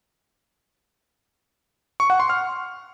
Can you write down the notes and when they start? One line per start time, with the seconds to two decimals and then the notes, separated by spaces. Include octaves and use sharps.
2.00 C#6
2.10 F#5
2.20 C6
2.30 F6